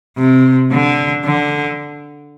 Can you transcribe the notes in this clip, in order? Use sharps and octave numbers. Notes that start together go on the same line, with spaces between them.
C3
D3
D3